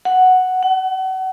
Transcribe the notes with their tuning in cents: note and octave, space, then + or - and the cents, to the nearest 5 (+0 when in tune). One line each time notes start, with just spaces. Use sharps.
F#5 +0
F#5 +35